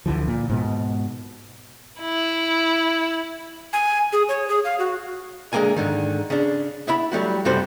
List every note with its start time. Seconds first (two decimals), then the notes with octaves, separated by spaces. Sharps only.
0.06 D2 D3 E3 F3
0.28 A#2
0.49 G#2 B2
2.00 E4
3.73 G#5
4.13 G#4
4.29 C#5
4.48 G#4
4.64 F5
4.79 F#4
5.53 D3 G#3 A#3 A#4 G#5
5.76 G#2 D3 D#3
6.30 C#3 D4
6.87 B3 E4 E5 B5
7.12 F#3 G3 A3 F#4
7.45 F#2 C3 G3 F#4 A4 C5